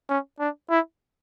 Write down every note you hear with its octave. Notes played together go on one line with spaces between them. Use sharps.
C#4
D4
E4